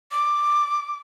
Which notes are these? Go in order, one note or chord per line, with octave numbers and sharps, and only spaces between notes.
D6